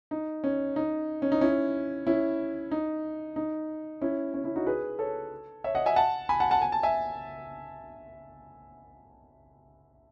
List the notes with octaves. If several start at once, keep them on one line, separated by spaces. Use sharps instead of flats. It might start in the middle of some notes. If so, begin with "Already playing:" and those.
D#4
C#4
D#4
C#4
D#4
C#4 E4
C#4 E4
D#4
D#4
C#4 E4
C#4
C#4 E4
D#4 F#4
G#4 B4
A4 C#5
C#5 E5
D#5 F#5
E5 G#5
F#5 A5
G#5 B5
F#5 A5
F#5 A5
G#5
A5
E5 G#5